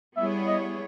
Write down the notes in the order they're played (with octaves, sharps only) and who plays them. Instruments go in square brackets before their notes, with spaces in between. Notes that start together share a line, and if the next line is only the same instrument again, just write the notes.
[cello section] G3 B3 E4 G#4 C#5 [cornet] E5
[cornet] D#5